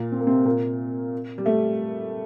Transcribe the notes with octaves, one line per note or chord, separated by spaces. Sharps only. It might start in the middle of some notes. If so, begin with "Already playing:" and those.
Already playing: A#2 A#3
C4
A#3
C3 C4
A#2 A#3
G3
A3